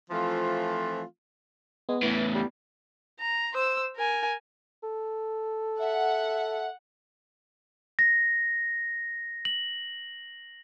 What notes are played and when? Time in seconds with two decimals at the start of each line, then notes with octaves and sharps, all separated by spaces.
0.10 E3 F3 A3 C4 F4
1.89 G#3 B3
2.03 E2 A2 E3
2.35 G3
3.20 A#5
3.54 C5 E6
3.97 A#4 G#5
4.83 A4
5.79 E5 F#5
7.99 A#6
9.45 F#7